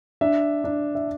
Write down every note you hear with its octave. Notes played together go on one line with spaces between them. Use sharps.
D4 E5
D4
E5